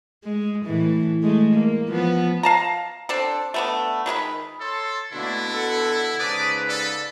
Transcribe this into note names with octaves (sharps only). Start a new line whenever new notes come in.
G#3
A2 E3
G#3 A3
A#3
F3 B3
F5 A5 A#5
C4 D4 A4
A3 B3 D4
D#3 G#3 E4 B4
A4 C#5 A5 C6
B2 D3 A3 A#3 D4 E4
A4 F#5
G#2 C#3 B4 D5 A5 D6 D#6
A4 D5